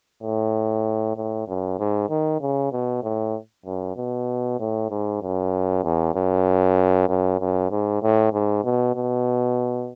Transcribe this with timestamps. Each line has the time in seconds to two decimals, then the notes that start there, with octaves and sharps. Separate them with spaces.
0.22 A2
1.16 A2
1.47 F#2
1.79 G#2
2.10 D#3
2.41 C#3
2.72 B2
3.03 A2
3.65 F#2
3.96 B2
4.59 A2
4.90 G#2
5.22 F#2
5.84 E2
6.15 F#2
7.09 F#2
7.40 F#2
7.71 G#2
8.02 A2
8.33 G#2
8.64 B2
8.95 B2